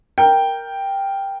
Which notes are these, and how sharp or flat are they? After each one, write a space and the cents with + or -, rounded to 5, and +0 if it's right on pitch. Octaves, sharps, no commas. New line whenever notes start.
A#4 +0 G5 +0